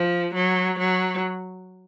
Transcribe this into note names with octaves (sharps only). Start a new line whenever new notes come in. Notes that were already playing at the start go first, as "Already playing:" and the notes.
Already playing: F3
F#3
F#3